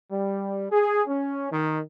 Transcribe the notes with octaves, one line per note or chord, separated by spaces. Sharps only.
G3
G#4
C#4
D#3